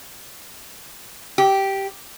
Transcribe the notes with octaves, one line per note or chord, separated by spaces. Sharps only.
G4